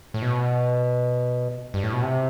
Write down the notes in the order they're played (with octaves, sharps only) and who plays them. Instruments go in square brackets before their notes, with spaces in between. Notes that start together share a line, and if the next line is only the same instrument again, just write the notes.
[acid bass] A2
B2
G2
A2
B2
C3